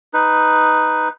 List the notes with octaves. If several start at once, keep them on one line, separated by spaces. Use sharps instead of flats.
D#4 B4